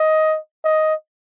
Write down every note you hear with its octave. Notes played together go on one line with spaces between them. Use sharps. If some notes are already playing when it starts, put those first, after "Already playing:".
Already playing: D#5
D#5